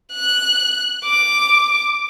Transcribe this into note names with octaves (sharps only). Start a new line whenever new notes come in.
F#6
D6